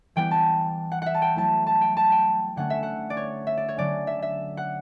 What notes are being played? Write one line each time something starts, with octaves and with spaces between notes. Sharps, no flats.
E3 G3 B3 E4 G5
A5
F#5
E5 F#5
A5
G5
F#3 A3 E4 A5
A5
G5
A5
G5
D3 A3 C#4 F#5
E5
F#5
D5
C#5
E5
D5
C#5
D3 F#3 C#4 D5
E5
E5
F#5